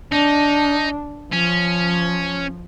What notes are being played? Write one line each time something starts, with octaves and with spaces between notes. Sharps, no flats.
D4 D#4
F3 C#4